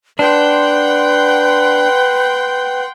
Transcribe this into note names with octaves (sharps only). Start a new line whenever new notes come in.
D4 B4 F#5 G5 C6